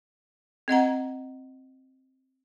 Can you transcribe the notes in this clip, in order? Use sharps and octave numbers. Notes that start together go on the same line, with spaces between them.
C4 D#5 F#5 A#5